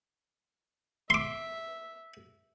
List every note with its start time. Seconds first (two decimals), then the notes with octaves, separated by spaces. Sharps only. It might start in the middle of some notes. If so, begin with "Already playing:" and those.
1.10 E5 C6 D6